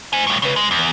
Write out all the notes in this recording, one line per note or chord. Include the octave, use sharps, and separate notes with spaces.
C5 G#5
A2 G3
C#3 B4
G#3
E2